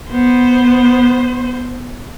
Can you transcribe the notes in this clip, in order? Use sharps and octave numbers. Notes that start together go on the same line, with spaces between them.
B3 C5